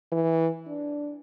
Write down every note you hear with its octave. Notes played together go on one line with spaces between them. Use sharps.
E3
D4